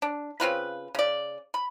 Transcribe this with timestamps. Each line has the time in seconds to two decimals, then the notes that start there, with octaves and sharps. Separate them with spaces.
0.02 D4
0.40 C#3 C4 F4 B4
0.95 C#3 D5
1.54 B5